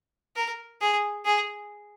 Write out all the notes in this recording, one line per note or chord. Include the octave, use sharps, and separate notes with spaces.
A#4
G#4
G#4